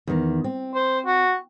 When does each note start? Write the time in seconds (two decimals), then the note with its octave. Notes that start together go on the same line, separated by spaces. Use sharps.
0.07 E2 D#3
0.44 C4
0.75 C5
1.06 F#4